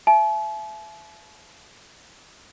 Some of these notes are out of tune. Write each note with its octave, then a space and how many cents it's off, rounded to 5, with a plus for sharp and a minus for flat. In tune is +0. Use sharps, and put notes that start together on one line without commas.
E5 +30 A5 -45